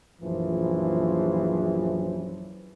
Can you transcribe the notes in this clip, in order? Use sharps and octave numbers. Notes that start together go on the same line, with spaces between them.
A#1 F#2 E3 F3